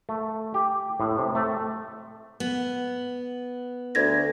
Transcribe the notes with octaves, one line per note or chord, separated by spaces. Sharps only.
A3
G4
A2
C3
A3
B3
D2 G#6 A#6